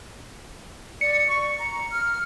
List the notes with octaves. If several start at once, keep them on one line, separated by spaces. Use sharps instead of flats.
D5 C#7
C#6
A#5
F6